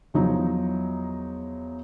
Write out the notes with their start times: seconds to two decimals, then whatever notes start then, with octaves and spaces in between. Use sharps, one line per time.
0.14 E2 F3 F#3 D#4